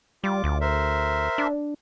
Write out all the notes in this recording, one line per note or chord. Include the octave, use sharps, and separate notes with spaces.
G3 F4 D6
D2
A#4 C5 E5
D4